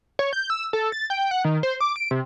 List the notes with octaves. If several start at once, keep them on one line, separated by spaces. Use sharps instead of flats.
C#5
G6
E6
A4
A6
G5
F#5
D#3
C5
D6
D7
C3